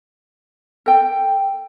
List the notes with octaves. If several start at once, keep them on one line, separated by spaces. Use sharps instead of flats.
A4 G5